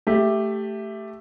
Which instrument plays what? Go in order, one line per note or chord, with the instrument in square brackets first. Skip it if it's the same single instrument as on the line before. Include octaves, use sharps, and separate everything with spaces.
[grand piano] A3 G4